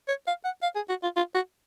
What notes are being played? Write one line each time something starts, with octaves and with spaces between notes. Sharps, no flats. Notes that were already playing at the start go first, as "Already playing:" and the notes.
C#5
F5
F#5
F5
G#4
F#4
F4
F4
F#4